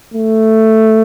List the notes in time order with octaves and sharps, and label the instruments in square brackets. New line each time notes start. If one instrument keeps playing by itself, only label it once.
[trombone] A3